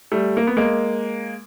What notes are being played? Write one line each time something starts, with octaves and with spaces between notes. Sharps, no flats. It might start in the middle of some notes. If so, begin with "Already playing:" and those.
G3 A3
A#3
B3
G#3 A#3